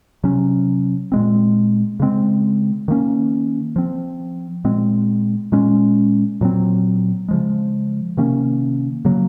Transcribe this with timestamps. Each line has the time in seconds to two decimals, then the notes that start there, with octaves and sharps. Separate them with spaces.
0.24 C3 F#3 C#4
1.12 A#2 G#3 C4
2.00 C#3 G#3 C4
2.88 D#3 A#3 C#4
3.76 F3 C4
4.64 A#2 G#3 C4
5.52 A#2 G#3 C#4
6.41 A#2 F#3 C4
7.28 C#3 F3 G#3
8.17 C3 D#3 A#3 C#4
9.05 C#3 F#3 A#3